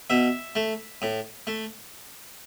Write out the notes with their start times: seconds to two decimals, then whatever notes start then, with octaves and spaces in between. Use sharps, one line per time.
0.10 B2 E5
0.55 A3
1.02 A2
1.47 A3